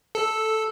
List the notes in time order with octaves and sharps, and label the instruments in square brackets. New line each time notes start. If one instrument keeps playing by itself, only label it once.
[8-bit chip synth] A4